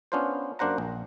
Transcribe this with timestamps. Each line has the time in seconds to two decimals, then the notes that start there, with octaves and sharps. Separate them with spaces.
0.12 B3 C#4 D4 F4 B4 C5
0.59 F#2 A#3 D4 C5 F#5 A#5
0.78 A#1